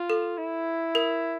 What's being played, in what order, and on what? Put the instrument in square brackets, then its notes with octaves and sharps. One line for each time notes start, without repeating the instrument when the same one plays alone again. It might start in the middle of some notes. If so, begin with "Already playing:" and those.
Already playing: [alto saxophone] F4
[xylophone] A4
[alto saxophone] E4
[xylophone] A#4